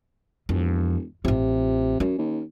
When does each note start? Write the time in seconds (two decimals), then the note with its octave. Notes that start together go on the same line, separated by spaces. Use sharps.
0.49 E1 F2
1.25 A1 C3 F4
2.00 F#2 C#4
2.18 D#2